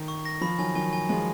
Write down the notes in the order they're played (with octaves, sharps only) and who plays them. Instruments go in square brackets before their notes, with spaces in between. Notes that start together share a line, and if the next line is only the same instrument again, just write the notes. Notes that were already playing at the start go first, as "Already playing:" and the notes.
Already playing: [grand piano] D#3
[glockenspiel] C#6
A#6
[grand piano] F3 [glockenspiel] B5
[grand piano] D#3 F#3 [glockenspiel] G#5
[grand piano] D#3 F#3 [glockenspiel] G#5
[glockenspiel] G#5
[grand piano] F3 G#3 [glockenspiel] G#5